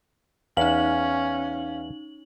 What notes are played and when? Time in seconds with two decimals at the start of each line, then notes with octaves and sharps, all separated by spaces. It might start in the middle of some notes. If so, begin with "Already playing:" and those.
0.57 E2 C#4 D#4 F5 F#7